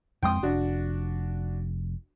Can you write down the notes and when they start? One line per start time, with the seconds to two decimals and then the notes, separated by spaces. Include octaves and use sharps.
0.23 F2 G#3 C4 G5 C6 D#6
0.43 F1 D4 F#4